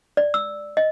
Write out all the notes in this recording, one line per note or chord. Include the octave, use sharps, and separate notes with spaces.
D5
E6
D#5